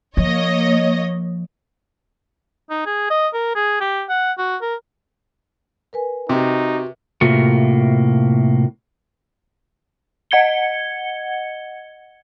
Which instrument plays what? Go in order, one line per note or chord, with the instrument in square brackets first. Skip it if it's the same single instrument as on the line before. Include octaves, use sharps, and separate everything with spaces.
[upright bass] F3 [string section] A#3 C#5 D#5
[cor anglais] D#4
G#4
D#5
A#4
G#4
G4
F#5
F#4
A#4
[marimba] A#4 B4 G#5
[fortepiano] C3 [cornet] D#4 [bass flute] F#4
[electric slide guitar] A2 C3 A#3 F4 F#4
[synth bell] D#5 F#5 G#6 C#7 G7